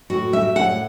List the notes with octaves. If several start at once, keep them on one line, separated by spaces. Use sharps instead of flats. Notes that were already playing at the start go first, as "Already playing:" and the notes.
A2 F#4
G3 E5
A2 F#5